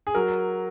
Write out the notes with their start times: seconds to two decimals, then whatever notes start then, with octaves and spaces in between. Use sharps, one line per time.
0.07 G#4
0.15 F#3 A#4